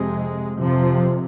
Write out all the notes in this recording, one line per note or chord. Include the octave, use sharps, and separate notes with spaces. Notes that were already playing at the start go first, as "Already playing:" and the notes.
Already playing: F2 C3 G#3
F2 C3 F3